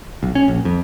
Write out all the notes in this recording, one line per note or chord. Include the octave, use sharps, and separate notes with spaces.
B1
C#4
A#1
F2